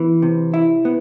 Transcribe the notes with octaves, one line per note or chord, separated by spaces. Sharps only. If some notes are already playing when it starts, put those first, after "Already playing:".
Already playing: E3 B3
C3
E4
B3